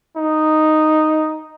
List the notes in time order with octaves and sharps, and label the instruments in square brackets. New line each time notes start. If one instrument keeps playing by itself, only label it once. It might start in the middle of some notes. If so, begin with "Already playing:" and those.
[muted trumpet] D#4